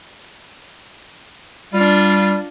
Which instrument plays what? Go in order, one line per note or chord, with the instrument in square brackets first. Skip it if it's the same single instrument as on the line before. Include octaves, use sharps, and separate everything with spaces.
[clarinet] G3 [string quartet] D4 F4